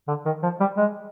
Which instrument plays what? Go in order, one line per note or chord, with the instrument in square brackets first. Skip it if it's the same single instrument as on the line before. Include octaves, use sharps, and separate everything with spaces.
[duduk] D3
D#3
F3
G3
G#3